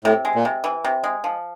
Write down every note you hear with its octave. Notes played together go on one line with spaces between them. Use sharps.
A2 C3
G#3
A#2
C3
E3
C3
G#3
F3